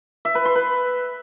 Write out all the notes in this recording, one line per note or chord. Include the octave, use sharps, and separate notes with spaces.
E5
B4
C6
B4